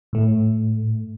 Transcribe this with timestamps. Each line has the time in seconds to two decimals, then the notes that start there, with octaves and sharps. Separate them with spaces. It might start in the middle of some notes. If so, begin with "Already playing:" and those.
0.13 A2 A3